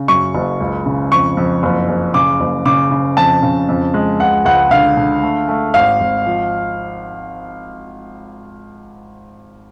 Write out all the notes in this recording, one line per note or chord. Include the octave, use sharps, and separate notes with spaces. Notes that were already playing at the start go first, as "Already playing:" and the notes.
Already playing: C#3
F#2 C#6
F#1
C#2
C#3
F2 C#6
F2
F#1
F#1
C#3 D6
F#1
C#3 D6
C#3
F2 A5
C#3
F2
G#3
C#2 F#5
C#2 F#5
D3 F5
D3
A3
A3
G#1 F5
G#1
F3